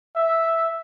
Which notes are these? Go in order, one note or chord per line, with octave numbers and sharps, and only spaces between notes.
E5